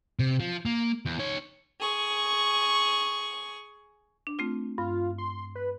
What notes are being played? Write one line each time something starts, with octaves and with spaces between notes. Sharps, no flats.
C3
F3
A#3
E2
D#4 C#5
G#4 C#6
D4
A3 C4 F4
G2 F4
C6
B4